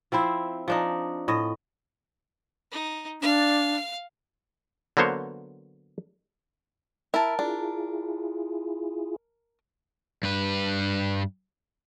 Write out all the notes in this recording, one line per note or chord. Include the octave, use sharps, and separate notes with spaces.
F3 C4 E4 C5
F3 D4 D#4
A2 D#5
D#4
D4 F5
D3 F#3 A#3 B3 C5 C#5
E4 A#4 A5
D4 E4 F4 G#4
G2 B4